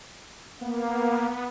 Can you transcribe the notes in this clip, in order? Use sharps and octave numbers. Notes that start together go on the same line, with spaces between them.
A#3 B3